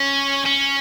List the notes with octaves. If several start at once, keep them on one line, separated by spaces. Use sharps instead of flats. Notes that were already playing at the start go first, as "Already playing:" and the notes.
Already playing: C#4
C#4